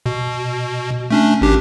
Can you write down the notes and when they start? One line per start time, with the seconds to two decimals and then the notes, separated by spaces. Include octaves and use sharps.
0.06 B2
1.11 A3 C#4 D4
1.41 G#1 D4 G4